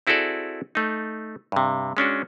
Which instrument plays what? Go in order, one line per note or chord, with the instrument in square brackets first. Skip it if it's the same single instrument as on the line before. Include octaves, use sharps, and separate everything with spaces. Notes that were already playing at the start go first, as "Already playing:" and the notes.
[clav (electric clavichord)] C4 E4 F#4 G#4 A4 D5
A3 D#4
G2 C3
G#3 C#4 D4 F#4